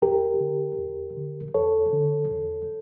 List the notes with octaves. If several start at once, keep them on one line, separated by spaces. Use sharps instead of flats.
E2 G4 A#4
D3
E2
D3
E2 A4 C#5
D3
E2